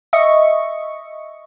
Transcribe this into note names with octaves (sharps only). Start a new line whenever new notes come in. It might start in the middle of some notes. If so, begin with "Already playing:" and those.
D#5 E5 C#6